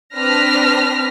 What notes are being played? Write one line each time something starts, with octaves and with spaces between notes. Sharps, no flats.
C4 D4 B4 F6 A#6 B6